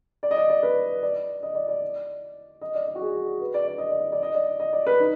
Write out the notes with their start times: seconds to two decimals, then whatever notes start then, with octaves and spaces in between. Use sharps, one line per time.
0.23 D5
0.31 D#5
0.37 D5
0.50 D5
0.63 B4
1.02 D5
1.43 D#5
1.55 D5
1.68 D5
2.61 D#5
2.75 D5
2.88 D5
2.95 F#4
3.01 G#4
3.41 B4
3.54 D5
3.67 D5
3.78 D#5
3.89 D5
4.00 D#5
4.12 D5
4.23 D#5
4.34 D5
4.60 D#5
4.73 D5
4.86 B4
5.00 D#4